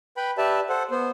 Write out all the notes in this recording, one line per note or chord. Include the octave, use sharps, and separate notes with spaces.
B4 G5 B5
G4 B4 D5 E5 A5
A4 C5 F#5
B3 C5